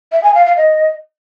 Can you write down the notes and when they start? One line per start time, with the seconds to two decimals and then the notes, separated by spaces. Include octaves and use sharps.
0.12 E5
0.24 G#5
0.35 F5
0.46 F5
0.57 D#5